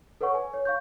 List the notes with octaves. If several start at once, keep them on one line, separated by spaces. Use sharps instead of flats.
A4 B4 C#5 F#5 C#6
G#5
C#5
F5 C#6 G6